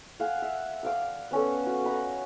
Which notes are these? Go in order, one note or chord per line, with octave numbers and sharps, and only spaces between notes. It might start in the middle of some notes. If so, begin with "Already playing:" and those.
F5 F#5 G#5
E5
D5 F5 D6
B3 C#4 A4
F#4
D#5 A#5 B5